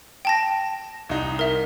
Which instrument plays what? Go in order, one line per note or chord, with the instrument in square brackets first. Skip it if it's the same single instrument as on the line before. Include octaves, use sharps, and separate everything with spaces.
[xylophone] G5 A5 A#6
[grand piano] C2 D#4
[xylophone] A#4 E5